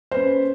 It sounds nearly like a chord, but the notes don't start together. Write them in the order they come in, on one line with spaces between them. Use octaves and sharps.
C5 B4 C#4